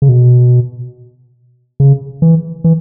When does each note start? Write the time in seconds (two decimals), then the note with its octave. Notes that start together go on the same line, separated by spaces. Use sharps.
0.02 C#3
0.09 B2
1.80 C#3
2.22 E3
2.64 E3